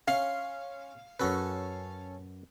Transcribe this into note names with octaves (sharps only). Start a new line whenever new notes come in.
C#4 F5 C6
F#2 C#4 F#4 A4 B4